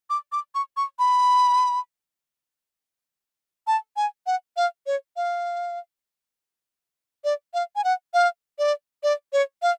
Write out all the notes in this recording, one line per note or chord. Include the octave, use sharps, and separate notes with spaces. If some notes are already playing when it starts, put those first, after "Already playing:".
D6
D6
C#6
C#6
B5
A5
G#5
F#5
F5
C#5
F5
D5
F5
G#5
F#5
F5
D5
D5
C#5
F5